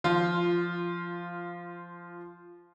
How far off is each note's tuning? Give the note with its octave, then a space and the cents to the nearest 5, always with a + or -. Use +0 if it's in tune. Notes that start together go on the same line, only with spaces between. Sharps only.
F3 -15 F4 +0